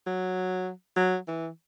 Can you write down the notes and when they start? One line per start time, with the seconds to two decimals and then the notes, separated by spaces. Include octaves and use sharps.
0.07 F#3
0.96 F#3
1.27 E3